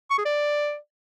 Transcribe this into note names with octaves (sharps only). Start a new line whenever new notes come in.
C#6
G#4
D5